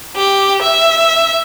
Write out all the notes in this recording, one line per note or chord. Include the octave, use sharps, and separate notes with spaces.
G4
E5